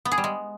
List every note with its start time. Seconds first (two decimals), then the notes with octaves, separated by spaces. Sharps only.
0.05 B3
0.12 G#4
0.18 G3
0.24 G#3